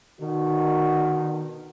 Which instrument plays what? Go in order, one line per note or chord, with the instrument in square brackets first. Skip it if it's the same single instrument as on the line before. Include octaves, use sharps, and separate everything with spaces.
[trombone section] B2 D3 D#3 [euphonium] F#4